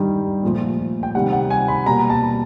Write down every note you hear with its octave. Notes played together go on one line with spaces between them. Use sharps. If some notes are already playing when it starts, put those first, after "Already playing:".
Already playing: G2 D#3 G3
A#2 F3 A3
G5
C3 D#3 G3 F#5
F#5
G#5
B5
B2 G3 A#3 A#5
A5